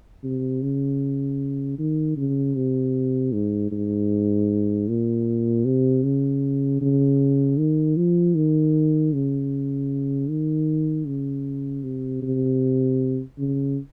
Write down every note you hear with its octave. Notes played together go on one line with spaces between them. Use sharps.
C3
C#3
D#3
C#3
C3
G#2
G#2
A#2
C3
C#3
C#3
D#3
F3
D#3
C#3
D#3
C#3
C3
C3
C#3